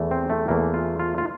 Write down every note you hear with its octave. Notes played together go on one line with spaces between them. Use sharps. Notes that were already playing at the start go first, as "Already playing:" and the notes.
Already playing: E2 E3 A3
C4
A3
E2 E3 A3 A#3
F4
F4
F4